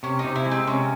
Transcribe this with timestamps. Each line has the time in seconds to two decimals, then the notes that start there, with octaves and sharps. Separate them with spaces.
0.03 C3 C#4
0.19 D#4
0.25 C3
0.36 E4
0.46 G#3
0.51 C4
0.67 C3 C#4